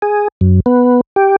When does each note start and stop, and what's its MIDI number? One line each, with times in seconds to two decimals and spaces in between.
0.02 0.28 68
0.41 0.60 42
0.66 1.01 59
1.16 1.36 67